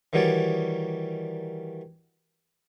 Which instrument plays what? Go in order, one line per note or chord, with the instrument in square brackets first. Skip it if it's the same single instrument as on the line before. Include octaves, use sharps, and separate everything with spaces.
[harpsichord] D#3 E3 G3 F#4 C#5 D5